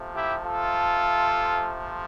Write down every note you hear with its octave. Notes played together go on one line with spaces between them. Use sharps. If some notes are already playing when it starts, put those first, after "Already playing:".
Already playing: C3 F3 A3
E4 G4
F4 A4